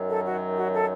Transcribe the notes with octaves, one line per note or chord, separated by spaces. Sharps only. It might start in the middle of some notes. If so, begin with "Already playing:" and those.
Already playing: F#2 D#3 F#3
A4
F#4
F#4
A4